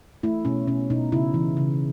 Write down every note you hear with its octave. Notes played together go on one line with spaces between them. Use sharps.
A3 E4
B2 C#4
B2 C#4
B2 D#4
C#3 E4
E3
C#3